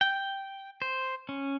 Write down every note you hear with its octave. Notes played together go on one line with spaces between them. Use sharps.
G5
C5
C#4